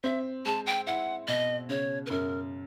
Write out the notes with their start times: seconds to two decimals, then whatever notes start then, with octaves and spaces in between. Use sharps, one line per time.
0.04 C4 E5
0.46 G#3 A5
0.66 G5
0.87 E4 F#5
1.28 B2 D#5
1.69 C#3 C#5
2.06 B4
2.10 F#2 A#4